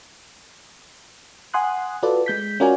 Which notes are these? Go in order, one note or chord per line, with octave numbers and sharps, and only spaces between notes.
F#5 G#5 C6 D#6 F#6
F4 F#4 A4 B4 D5
G#3 G6 B6
C#4 F4 F#4 A#4 D5 G#5